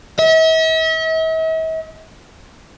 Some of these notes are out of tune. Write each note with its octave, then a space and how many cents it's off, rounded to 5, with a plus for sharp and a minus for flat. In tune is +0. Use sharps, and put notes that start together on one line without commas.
E5 -45